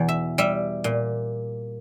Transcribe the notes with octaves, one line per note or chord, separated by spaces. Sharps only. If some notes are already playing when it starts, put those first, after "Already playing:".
Already playing: E2 B2
E5
G3 E5
A#2